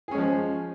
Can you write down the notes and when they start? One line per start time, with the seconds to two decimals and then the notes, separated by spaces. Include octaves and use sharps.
0.08 G#4
0.11 C#4
0.15 G#3
0.18 F3